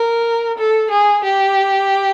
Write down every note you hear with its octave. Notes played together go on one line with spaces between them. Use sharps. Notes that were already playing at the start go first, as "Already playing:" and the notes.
Already playing: A#4
A4
G#4
G4